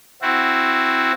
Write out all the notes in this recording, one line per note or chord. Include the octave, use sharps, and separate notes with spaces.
C4 E4 F#4